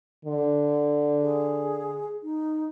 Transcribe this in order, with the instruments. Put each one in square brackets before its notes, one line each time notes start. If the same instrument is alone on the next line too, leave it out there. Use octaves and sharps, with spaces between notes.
[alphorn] D3
[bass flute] G#4
D#4